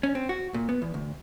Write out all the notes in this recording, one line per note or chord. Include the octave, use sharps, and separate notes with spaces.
C#4
C4
F#4
A#2
B3
E2
D2